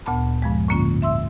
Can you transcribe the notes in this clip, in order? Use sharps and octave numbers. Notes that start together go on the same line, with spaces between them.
D2 A#2 B3 A5 B5
G2 F3 G#3
A2 D3 A#3 C#4 F4
E5 C6 E6